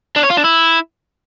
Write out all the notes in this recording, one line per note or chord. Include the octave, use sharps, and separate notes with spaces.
D4
C#5
F4
D4
E4